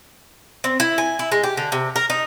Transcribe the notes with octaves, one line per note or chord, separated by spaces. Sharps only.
C4
E4
G#5
E4
G#3
G4
D3
C3
A#4
D#4